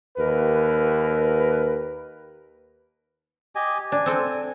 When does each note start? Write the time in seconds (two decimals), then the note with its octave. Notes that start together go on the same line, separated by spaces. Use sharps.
0.17 D#2 A#4 B4
3.55 G4 D#5 G#5
3.92 D4 G#5
4.06 C4 A4 G5